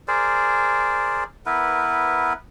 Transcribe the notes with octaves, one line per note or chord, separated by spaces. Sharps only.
G#4 A#4 C5 D5
B3 E4 A#4 B4